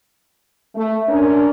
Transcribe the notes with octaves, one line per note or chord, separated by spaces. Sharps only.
A3
C#4 D4 A#4